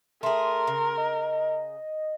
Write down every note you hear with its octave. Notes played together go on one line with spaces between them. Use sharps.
A3 G#4 A#4 C6
C#3
D#5